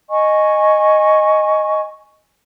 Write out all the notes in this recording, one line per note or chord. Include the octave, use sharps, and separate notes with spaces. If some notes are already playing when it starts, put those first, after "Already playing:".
D#5 G#5 C#6